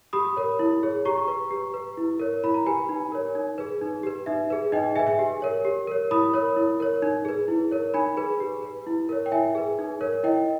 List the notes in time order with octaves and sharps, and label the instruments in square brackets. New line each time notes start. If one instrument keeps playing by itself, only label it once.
[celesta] G4 B5 D#6
A#4 C#5
E4
G#4 C#5
G4 A#5 C#6
B4
G4
B4
E4
A#4 C#5
E4 B5
A#5
G4 B4 G#5 B5
D#4
A#4 C#5
D#4
G#4 B4
D#4
G4 B4
D#4 E5
G#4 B4
D#4 D#5 G5
G#4 B4 E5 G#5
E5 G#5
G4
A#4 C#5
G4
A#4 C#5
E4 B5 D#6
A#4 C#5
E4
A#4 C#5
D#4
G#4 B4
E4
A#4 C#5
D#4 G#5 B5
G#4 B4
G4
B4
E4
A#4 C#5
G5
E4 E5 G#5
G#4 B4
D#4
A#4 C#5
E4 D#5 G5